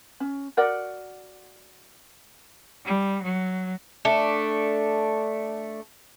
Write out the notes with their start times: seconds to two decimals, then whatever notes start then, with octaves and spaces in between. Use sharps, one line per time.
0.20 C#4
0.57 F#4 A#4 D5 F#5
2.85 G3
3.23 F#3
4.05 A3 D4